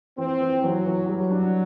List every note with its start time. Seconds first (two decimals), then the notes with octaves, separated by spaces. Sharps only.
0.18 E3 C4
0.41 E3
0.63 E3 F#3
0.85 E3
1.08 F#3 G3
1.31 D4